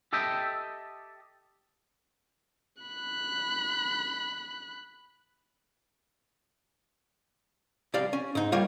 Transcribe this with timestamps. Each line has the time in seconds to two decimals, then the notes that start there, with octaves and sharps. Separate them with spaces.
0.13 G4 A4 D#5 E5 G5
2.83 B5 F#6
7.94 C2 G4 D5 F5
8.13 C#4
8.35 G#2 D#4
8.52 G3 A#3 F4 C#5